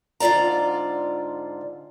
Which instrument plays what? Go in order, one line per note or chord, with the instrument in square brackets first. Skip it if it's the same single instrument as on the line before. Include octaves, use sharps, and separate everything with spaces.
[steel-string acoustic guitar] G#2 D3 F4 D5 A#5